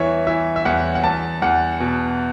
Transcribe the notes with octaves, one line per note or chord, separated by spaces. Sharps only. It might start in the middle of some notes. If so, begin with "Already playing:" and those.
Already playing: E2 E3 C#5 E5
E3 E5
E5
E2 F#5
F#5
E2 A5
E2 F#5
B2